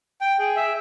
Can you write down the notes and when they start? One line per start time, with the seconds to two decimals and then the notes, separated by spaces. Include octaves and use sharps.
0.21 G5
0.39 G#4
0.56 E5